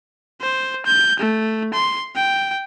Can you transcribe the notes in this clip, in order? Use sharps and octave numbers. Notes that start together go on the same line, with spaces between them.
C5
G6
A3
C6
G5